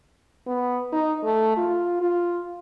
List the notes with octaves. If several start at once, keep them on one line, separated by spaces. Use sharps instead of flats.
B3
D#4
A3
F4
F4